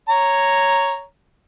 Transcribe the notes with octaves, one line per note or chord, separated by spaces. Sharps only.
C#5 A#5